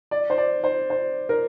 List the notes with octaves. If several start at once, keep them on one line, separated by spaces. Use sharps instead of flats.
D5
C5
D5
C5
C5
A#4